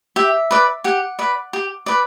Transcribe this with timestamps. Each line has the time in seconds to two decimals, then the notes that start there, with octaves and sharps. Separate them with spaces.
0.16 G4 E5
0.51 B4 D5
0.84 G4 F#5
1.19 B4 D5
1.53 G4
1.86 B4 D5